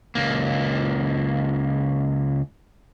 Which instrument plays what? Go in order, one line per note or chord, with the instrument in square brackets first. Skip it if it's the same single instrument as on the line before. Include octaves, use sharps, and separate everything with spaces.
[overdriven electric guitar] C#2 A#3